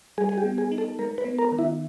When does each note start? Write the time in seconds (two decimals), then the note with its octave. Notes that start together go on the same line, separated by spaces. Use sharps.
0.18 G3 G#4
0.29 G#4
0.38 G4
0.45 B3
0.58 G#4
0.72 D#4
0.78 A4
0.99 G#3 A#4
1.18 B4
1.25 B3
1.39 A#4
1.52 D#3
1.59 E4